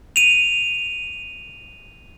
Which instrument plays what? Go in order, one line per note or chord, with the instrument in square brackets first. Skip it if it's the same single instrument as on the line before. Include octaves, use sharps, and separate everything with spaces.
[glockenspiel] D#7 F7